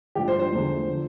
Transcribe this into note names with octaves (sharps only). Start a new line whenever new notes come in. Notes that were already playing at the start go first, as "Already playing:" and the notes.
A1 G2 F3 G4
C5
C5
E2 D3 F3
D3 F3